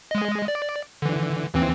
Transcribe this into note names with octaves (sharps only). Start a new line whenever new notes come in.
G#3 D#5
D5
D3 E3
D#2 E3 C4